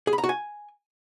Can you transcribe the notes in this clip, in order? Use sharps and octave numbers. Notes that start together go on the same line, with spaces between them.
G#4
B5
A#5
F#4
G#5